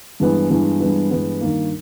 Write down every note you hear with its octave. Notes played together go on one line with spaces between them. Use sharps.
G2 E3 G#3 B3
G2 E3 G#3 B3
G2 E3 G#3 B3
G2 E3 G#3 B3
G2 D#3 A#3